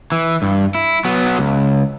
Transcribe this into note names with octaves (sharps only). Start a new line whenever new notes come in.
E3
G2
E4
F#3 B3
C#2